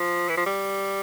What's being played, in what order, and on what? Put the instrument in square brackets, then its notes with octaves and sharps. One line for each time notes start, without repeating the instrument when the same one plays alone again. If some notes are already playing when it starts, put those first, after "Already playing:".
Already playing: [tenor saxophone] F3
E3
F3
G3